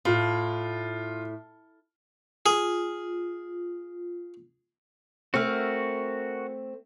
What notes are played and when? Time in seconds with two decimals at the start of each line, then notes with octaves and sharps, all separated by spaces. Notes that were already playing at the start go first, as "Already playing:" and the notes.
0.05 A2 F4
2.46 F4 G#4
5.34 A3 C4 F#4 A#4 F6